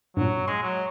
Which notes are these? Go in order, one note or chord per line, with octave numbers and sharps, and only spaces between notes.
G2 A#2 F#3
G#3 C6
F#3